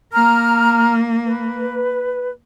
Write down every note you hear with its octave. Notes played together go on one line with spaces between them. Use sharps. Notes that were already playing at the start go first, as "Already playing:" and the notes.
A#3 A#5 F6
B4